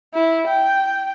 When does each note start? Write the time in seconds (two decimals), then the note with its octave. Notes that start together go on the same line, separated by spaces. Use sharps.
0.14 E4
0.48 G5